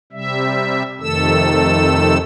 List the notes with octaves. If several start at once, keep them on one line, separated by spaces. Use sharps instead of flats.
C3 G3 E5
F2 C3 D#3 A3 A4 E6